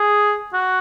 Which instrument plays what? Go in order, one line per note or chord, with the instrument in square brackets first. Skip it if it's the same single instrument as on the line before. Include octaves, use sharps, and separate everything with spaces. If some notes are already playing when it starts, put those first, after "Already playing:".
Already playing: [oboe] G#4
F#4